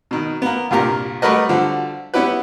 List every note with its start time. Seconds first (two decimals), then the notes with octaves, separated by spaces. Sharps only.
0.11 B2 D#3
0.42 A#3 B3
0.71 C2 G2 A#2 G4 A#4 A#5
1.22 G3 A3 F#4 A#4 B4 D#5
1.49 D3 F3 G3 F#4
2.14 B3 C#4 E4 F#4 G4 B4